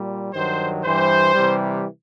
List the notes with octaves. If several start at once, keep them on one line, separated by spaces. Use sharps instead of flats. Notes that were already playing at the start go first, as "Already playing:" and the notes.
Already playing: A#2 G3
G2 D#3 F#3 C5
G2 E3 G3 C5
C3 E3 G3